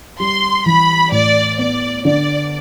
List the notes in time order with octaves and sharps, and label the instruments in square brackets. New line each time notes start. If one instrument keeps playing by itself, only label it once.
[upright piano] G3 [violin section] C6
[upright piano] E3 [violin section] B5
[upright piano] A2 [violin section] D5
[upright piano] B3 [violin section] D5
[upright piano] D3 [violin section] D5